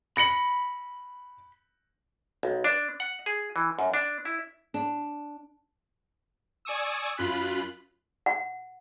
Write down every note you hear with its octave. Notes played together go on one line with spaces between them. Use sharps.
B5 A#6 C#7 F#7
B1
D4
F#5
G#4
E3
F#2
D4
E4
D4
D5 G#5 C#6 D#6 E6
F#2 F4 B5 F#6
F#5